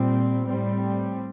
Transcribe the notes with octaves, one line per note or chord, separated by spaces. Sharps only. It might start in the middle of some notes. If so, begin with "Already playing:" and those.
Already playing: A#2 G3 C4
A2 G3 C4